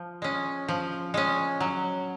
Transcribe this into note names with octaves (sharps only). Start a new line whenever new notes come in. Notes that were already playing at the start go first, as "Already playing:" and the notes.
Already playing: F3
G#3 C#4
F3
G#3 C#4
F#3